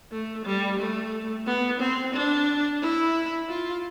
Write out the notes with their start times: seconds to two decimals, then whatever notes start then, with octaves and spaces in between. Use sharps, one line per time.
0.12 A3
0.46 G3
0.80 A3
1.46 B3
1.80 C4
2.14 D4
2.82 E4
3.49 F4